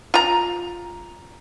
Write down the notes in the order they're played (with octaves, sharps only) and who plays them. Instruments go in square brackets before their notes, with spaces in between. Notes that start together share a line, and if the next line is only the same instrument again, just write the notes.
[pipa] F4 A#5